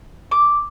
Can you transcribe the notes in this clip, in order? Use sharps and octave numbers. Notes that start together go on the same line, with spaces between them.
D6